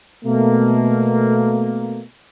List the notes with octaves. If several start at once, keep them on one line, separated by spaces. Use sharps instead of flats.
B2 A3 A#3